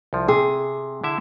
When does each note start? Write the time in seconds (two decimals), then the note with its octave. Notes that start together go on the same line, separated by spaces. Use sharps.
0.13 C2 F3
0.28 C3 G#4
1.04 D3 E4 E5